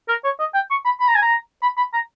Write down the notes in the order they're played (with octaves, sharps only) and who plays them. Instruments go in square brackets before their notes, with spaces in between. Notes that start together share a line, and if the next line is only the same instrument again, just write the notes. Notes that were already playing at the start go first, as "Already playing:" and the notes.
[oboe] A#4
C#5
D#5
G5
C#6
B5
B5
A#5
G#5
A#5
B5
B5
A#5